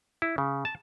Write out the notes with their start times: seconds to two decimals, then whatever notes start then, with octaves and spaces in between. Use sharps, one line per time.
0.22 E4
0.38 C#3
0.65 A5